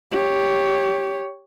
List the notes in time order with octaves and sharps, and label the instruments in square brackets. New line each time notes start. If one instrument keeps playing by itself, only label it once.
[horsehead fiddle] G4 C#5